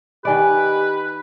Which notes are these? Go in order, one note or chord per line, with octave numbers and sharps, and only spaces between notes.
D#3 G4 B4 D5 D#5 G#5